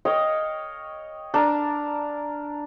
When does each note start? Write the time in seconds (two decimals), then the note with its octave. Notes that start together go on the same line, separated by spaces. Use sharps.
0.05 C#5 D#5 F5 G5
1.34 D4 A#4 A5